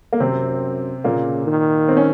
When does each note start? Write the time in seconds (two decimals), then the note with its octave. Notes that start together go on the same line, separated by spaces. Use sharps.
0.13 A#3
0.20 F#2 C3 C4
1.04 A#2 C#3 A#3
1.47 D#3
1.88 C4
1.97 C#4